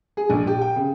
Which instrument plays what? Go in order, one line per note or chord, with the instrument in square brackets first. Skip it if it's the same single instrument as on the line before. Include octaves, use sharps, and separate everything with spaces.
[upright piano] G#4
A#1
G4
G5
C#3